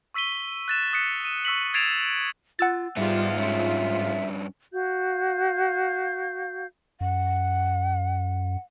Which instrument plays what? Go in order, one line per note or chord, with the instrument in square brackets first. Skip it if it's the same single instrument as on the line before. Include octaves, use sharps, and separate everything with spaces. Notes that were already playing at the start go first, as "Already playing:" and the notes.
[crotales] C#6 E6 B6 D#7 G7
F#6 A6 E7
D#6 F#6 B6 C#7
D#7 E7
C#6 E6 B6 F#7
G#6 A6 C7 D7 E7 F7
[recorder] F4 [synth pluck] F#5 E6 A6
[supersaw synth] G#2 F4 [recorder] G3 [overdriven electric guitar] B3 E5
[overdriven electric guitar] G2 C#4 [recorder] E5
[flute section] F#4 F5 G6
[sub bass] F#2 [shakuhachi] F#5